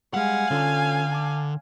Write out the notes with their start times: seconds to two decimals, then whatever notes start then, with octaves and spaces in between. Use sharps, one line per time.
0.14 G3 G#3 F5 F#5 G#5
0.51 D3 C#4 F4 A4
1.12 A5 D6